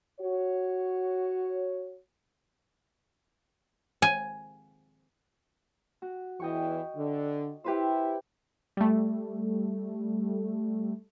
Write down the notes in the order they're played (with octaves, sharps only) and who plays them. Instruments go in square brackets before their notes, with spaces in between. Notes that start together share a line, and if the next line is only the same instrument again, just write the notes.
[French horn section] F#4 C#5
[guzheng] G#5
[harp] F#4
[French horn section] E2 E3 [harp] D#5 G5 C#6
[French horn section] D3
[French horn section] E4 [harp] G4 B4 C5
[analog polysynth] G3 A3